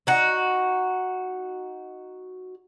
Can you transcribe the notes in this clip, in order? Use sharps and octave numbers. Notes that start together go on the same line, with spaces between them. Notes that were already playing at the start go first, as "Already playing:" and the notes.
D#4 F#4